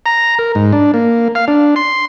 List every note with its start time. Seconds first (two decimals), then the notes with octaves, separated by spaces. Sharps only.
0.06 A#5
0.39 A#4
0.55 G#2
0.73 D4
0.94 A#3
1.35 F5
1.48 D4
1.76 C6